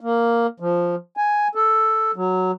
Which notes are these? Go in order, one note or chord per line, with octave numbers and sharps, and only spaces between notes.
A#3
F3
G#5
A4
F#3